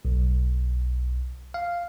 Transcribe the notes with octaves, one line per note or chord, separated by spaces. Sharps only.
B1
F5